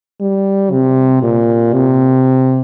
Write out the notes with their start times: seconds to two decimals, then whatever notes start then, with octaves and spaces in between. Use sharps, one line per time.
0.21 G3
0.72 C3
1.23 A#2
1.73 C3